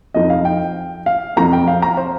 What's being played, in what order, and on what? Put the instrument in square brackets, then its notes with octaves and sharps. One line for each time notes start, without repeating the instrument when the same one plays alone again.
[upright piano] F2 F3 C4 D#4 D#5
F5
G5
F5
F2 F3 C4 A#5
G5
F5
A#5
C5